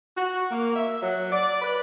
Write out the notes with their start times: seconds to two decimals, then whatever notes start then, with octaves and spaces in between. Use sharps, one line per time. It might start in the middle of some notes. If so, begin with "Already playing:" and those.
0.17 F#4
0.51 A#3
0.76 E5
1.03 F#3
1.32 D5
1.62 B4